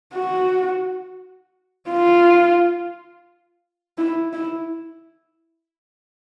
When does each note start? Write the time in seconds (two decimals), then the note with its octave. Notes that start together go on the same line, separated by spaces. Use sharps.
0.14 F#4
1.89 F4
3.98 E4
4.33 E4